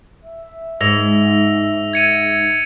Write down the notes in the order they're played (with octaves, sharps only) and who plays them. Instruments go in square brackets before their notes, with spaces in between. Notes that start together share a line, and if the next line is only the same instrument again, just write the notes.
[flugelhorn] E5
[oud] G#2 [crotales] E6 A#6 F7
[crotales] G#6 C#7 D#7